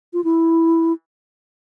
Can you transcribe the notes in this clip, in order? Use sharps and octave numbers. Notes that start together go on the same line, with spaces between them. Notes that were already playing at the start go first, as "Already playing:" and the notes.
F4
E4